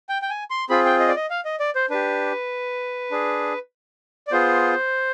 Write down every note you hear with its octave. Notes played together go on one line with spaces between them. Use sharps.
G5
G5
G#5
C6
C4 F4 G#4 B5
G5
D#5
D5
D#5
F5
D#5
D5
C5
D4 G4 B4
D4 G#4
D5
B3 F4 G#4 C5